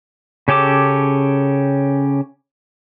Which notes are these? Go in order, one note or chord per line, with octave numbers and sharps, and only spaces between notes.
C#3 C#4 G4 A4 D6